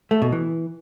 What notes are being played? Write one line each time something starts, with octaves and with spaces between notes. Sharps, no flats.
A3
B2
E3